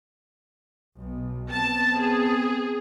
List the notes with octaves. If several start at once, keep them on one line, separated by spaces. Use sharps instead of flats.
B1 B2
B3 C4 A5
G#4